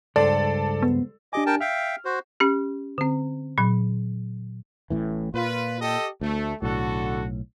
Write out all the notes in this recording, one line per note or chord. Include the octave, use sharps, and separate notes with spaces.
C#2 G2 A4 C5 D5
B3
D4 G4 D#5 G#5 D6
A#4 G5 A5
E5 F5 G5 F6
F#4 C5
C#4 G4
D3 C4
A#2 F#3
A1 A2 E3
A#2 F4 B4
G4 A4 D#5
D2 A3
B1 A2 D3 F#4 A4